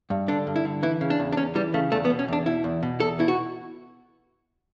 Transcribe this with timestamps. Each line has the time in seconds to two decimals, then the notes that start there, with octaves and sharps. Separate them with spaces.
0.10 G2
0.28 D3 D4
0.47 G2
0.56 E4
0.65 D3
0.83 E3 E4
1.01 C#3
1.10 D4
1.20 E2
1.33 D4
1.37 E2 C#4
1.55 E3 G3
1.74 C#3 A3
1.92 E2 A3
2.05 B3
2.10 B2
2.19 C#4
2.28 E2 D4
2.46 B2 E4
2.64 E2
2.83 B2
3.00 E2 A4
3.19 B2 E4
3.28 F#4